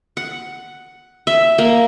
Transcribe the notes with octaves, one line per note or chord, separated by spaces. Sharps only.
F#5
E5
A#3